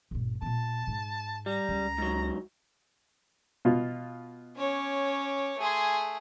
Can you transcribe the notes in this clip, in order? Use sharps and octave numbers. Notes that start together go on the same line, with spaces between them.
G1 A#2
A#2 B3 A5
G#2
G3 A#5
C#2
G#2 F#3
B2 F4
C#4 C#5 D6
A3 G#4 G#5 C6